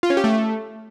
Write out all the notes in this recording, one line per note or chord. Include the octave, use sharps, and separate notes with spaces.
F4
C#4
G4
A3